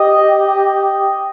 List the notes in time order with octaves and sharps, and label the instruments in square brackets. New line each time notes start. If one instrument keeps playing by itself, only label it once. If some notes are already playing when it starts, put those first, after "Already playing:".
Already playing: [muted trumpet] G4 [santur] D#5